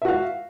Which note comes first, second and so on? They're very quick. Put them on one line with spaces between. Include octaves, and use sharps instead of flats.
E5 F#4 F5